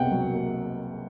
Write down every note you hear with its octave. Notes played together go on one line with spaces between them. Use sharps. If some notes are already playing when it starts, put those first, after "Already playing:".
Already playing: C2 B2 A#3 F#5 G5
F#3
A#3